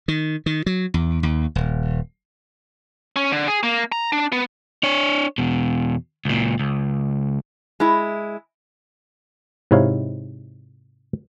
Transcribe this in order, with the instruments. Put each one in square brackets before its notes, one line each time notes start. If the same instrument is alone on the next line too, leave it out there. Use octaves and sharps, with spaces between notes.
[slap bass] D#3
D#3
F#3
E2
D#2
D#1
[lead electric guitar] C#4
D3
G#4
A#3
A#5
D4
B3
[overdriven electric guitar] D4 C#5
E2 B2
C#2 A#2
C#2
[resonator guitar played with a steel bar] G#3 E4
[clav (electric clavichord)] G#2 C3 D#4 E4 C#5 F5